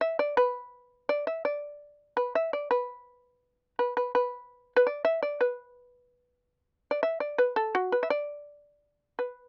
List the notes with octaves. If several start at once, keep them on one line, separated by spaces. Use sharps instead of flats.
E5
D5
B4
D5
E5
D5
B4
E5
D5
B4
B4
B4
B4
B4
D5
E5
D5
B4
D5
E5
D5
B4
A4
F#4
B4
E5
D5
B4